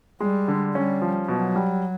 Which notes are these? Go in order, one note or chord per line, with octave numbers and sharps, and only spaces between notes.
G3 G#3
D3
G3 C#4
F3
B2 F#3
G3